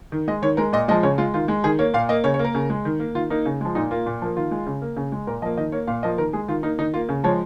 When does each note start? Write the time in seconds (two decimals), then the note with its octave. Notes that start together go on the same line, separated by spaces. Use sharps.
0.12 D#3
0.28 G#3 D#5
0.42 D#3 C#5
0.57 G#3 A#4
0.73 A#2 D#5
0.88 F3 G#3 D#5
1.03 C#3 C#5
1.18 G#3 F4
1.34 D#3 F4
1.48 G#3
1.64 D#3 G#4
1.79 A#3 C#5
1.94 A#2 F5
2.09 A#3 D#5
2.24 C#3 C#5
2.34 C#5
2.39 A#3
2.44 A#4
2.55 C#3
2.70 G#3
2.85 D#3
3.00 A#3
3.15 D#3 F4
3.30 A#3 D#4
3.45 C#3
3.61 F3 G#3
3.75 A#2 D#4
3.91 A#3 F4
4.06 A#2
4.22 F3 A#3
4.37 D#3 F4
4.51 G#3
4.67 C#3
4.82 A#3
4.97 C#3
5.12 G#3
5.27 A#2 A#4
5.42 F3 A#3 D#5
5.57 D#3 D#5
5.72 A#3 C#5
5.87 A#2 F5
6.03 F3 A#3 D#5
6.18 D#3 A#4
6.33 G#3 G#4
6.48 D#3 F4
6.63 A#3 D#4
6.79 D#3 D#4
6.94 A#3 F4
7.09 C#3
7.24 F3 G#3 C#5